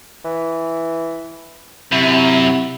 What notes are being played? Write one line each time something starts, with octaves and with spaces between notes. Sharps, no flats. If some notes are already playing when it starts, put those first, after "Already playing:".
E3
F#2 C3 E4